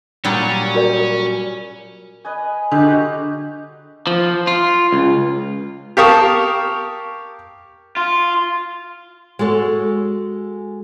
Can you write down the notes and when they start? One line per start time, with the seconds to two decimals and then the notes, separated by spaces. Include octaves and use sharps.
0.24 A#2 F#3 G3 C#4
0.75 F#4 A#4 D5
2.25 B4 D#5 G#5
2.71 D3 G#3 D#4 G4
2.85 F#4
4.07 F3
4.47 F4
4.92 C#2
5.97 G4 A#4 F5 A5 C#6 D#6
7.97 F4
9.39 G#3 F#4 A4 C#5